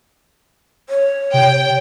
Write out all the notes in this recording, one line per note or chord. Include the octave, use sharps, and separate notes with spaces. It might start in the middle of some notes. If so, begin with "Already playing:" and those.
C#5
C3 G5